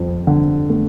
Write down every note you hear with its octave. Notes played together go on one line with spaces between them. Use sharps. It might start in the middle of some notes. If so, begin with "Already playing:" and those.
Already playing: F2 C4
D3
A3